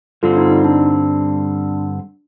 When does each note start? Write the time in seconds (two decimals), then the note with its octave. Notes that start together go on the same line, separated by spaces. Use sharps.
0.23 G2 D3 G3 C4 F4 A4
0.37 D#4
0.50 D#4
0.64 D4